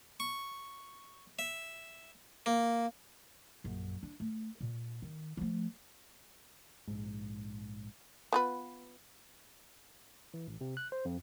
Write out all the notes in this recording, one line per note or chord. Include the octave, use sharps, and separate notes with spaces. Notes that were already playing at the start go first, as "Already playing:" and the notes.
C#6
E5
A#3
A#1 F#2
D4
A3
A#2
D#3
F3 A3
A#1 G#2
B3 F4 B4
E3
A1
C3
F#6
C5
F2